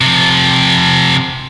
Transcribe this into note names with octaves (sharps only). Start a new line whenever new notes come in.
C3 F3